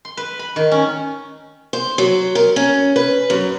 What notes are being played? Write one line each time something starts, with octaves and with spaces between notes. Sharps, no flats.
C6
B4
B5
D#3
C#4
C5
F#3
A#4
C#4
B4
F#2